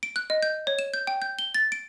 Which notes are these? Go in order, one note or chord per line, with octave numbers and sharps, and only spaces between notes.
D7
F#6
D#5
G6
C#5
E7
G6
G5
G6
G7
A6
D7